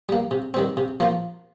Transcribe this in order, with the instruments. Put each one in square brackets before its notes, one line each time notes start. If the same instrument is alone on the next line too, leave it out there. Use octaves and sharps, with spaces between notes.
[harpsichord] G3 A#3
C3
D#3 G3 C4
C3
F3 A#3 F4